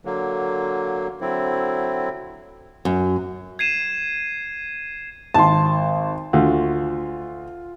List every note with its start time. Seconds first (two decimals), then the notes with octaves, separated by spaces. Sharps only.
0.05 D3 F#3 A#3
1.21 D3 F#3 C4 E4
2.85 F#2
3.59 G#6 C7 D#7 E7
5.34 G#1 A5 C6
6.33 D2 F4